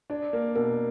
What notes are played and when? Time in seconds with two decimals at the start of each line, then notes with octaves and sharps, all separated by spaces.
0.10 D4 D5
0.33 A#3
0.56 B2 A#4